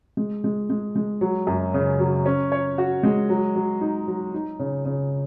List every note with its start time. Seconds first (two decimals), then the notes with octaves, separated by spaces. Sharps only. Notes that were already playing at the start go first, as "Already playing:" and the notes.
0.17 G#3
0.44 G#3
0.70 G#3
0.96 G#3
1.21 F#3
1.47 F#2
1.74 C#3
2.00 F#3
2.26 C#4
2.52 C#5
2.78 F#4
3.03 G#3
3.30 F#3
3.56 F#3
3.81 D#4
4.08 F#3
4.34 D#4
4.59 C#3
4.85 C#3